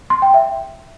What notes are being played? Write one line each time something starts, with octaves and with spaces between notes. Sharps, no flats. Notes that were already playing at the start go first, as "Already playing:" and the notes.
C6
G5
E5